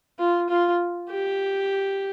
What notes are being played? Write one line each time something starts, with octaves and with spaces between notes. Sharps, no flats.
F4
F4
G4